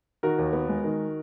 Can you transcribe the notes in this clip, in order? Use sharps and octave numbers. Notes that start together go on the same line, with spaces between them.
D#3 F#4 A#4
D#2
B3
G#3
D#3